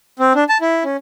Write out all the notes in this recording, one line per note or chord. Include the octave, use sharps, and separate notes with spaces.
C4
D4
A5
E4
C#4